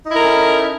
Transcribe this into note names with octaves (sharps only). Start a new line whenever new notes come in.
C#4 D#4 E4 A4 A#4